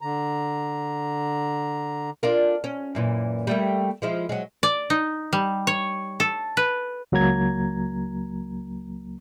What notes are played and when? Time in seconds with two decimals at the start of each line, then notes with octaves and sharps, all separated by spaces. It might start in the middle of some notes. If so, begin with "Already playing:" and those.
0.01 D3 A#5
2.23 D4 F4 A#4
2.64 C#4
2.95 F#2 A#2 E3
3.47 G3 A3 A#3
4.02 F3 G#3 E4
4.29 F#3 G#3
4.63 D5
4.90 D#4
5.33 G3
5.67 C#5
6.20 A4
6.57 B4
7.12 C#2 F#3 A#3 A#5 G#6